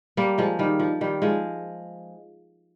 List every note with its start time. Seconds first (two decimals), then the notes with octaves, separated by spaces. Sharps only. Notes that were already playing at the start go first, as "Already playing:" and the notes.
0.17 G3 A#3
0.38 F3 G#3
0.59 D#3 G3
0.80 F3
1.01 D#3 G3
1.22 F3 G#3